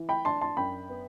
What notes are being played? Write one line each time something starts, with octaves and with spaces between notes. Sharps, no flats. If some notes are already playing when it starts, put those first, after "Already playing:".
Already playing: E3
G5 B5
D4 A5 C6
A5 C6
F#2 G5 B5
B3